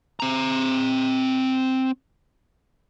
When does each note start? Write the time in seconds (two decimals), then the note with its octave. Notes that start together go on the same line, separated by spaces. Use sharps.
0.20 C4 A#5